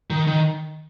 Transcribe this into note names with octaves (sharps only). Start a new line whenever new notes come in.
D#3
D#3